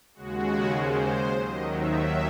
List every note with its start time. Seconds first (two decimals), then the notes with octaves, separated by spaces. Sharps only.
0.14 D#2 C#3 G#3 F#4
0.75 C5
1.36 D#2 D#3 F#3 D#5
1.66 E5